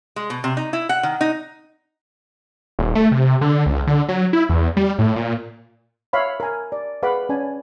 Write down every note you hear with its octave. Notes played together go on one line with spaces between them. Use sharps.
G#3
B2
C3
D#4
E4
F#5
D#3
D#4
D#1
A3
C3
D3
C#2
D3
F#3
E4
E2
G3
A2
A#2
C#5 E5 F5 B5 C6
A#4 G#5
D5
G#4 B4 F5 F#5 B5 D6
C#4 D5 G#5 A5